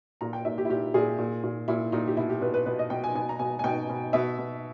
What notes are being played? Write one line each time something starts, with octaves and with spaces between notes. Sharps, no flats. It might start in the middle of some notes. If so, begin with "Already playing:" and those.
A#2 A#5
G5
A#2 E5
G4
E4
A#2 G4
A#2 G#4
A#2
A#2
A#2 E4
A#2 D#4
G4
B2 E4
G4
B2 B4
B4
B2 B4
D#5
B2 G5
G#5
B2 G#5
A#5
B2 G#5
G#5
B2 G5
B2
B2 E5
B2